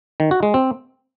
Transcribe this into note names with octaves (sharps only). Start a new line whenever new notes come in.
D#3
F#4
G#3
C4